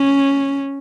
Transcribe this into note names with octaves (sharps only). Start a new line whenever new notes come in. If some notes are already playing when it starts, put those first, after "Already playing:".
Already playing: C#4